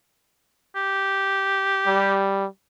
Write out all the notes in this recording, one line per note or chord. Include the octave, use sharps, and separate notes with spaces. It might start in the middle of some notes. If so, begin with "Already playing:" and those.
G4
G3